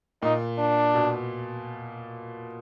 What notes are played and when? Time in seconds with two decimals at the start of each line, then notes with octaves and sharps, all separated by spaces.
0.22 A#2 D#4
0.59 D4
0.95 B2